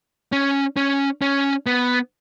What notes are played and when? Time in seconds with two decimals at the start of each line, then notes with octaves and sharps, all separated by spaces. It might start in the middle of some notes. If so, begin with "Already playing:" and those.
0.32 C#4
0.77 C#4
1.22 C#4
1.66 B3